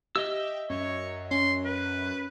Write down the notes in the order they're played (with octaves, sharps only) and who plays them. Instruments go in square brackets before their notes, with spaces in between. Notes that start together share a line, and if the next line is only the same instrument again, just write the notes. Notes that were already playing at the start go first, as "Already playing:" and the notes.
[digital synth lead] G4 [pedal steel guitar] D#5 E5 E6
[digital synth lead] F#2 [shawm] C#5
[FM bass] C#4 [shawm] C6
[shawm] B4